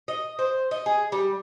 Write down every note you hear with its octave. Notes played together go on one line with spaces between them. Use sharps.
D#5
C5
D#5
G#4
G3